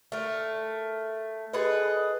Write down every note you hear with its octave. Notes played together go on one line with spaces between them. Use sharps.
A3 A#4
G#4 A4 B4 D#5